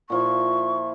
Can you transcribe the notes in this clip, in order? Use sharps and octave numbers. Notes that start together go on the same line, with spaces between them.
A#2 F3 E4 C#6